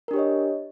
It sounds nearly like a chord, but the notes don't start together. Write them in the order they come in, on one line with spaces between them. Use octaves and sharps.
A#4 D4 G4 C#5 D#5